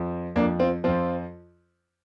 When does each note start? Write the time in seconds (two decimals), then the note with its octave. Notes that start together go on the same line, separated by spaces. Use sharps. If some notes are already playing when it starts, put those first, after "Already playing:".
Already playing: F2 F3
0.36 F2 A#3 D4
0.39 F3
0.59 C4 F4
0.84 F2 F3 C4 F4